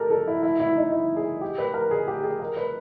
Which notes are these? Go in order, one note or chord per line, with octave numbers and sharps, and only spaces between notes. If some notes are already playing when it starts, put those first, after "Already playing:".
Already playing: G4 A4 A#4
A4
E4
E4
E4
D#4
E4
G#4
G4
B4
A#4
G#4
G4
G#4
A#4
B4